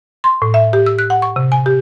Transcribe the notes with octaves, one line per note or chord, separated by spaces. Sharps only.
C6
A2
E5
G4
E6
F#6
F#5
C#6
C3
G#5
G4